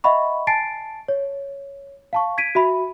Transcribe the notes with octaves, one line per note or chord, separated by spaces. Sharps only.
D#5 E5 F#5 B5 C#6
G#5 A5 A6 C7 D7
C#5
F5 A5 C#6
G#6 B6 D7 D#7
F#4 E5 B5